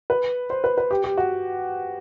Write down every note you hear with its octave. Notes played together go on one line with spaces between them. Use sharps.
B4
C5
B4
B4
G4
G4
F#4